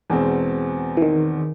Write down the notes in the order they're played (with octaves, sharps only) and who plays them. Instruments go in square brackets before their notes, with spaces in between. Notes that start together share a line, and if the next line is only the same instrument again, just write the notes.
[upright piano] E2 B2 G#3 C4
[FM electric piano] E3
D#3